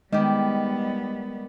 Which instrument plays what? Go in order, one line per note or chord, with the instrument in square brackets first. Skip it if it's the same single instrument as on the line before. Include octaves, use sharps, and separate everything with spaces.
[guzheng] D#3 G4 [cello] G3 B3 [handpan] G#3